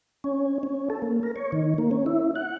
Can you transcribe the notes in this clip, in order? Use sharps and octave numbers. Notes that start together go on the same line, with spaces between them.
C#4
C#4
A4
A#3
A#4
C#5
D#3
A#3
C#4
E4
F#5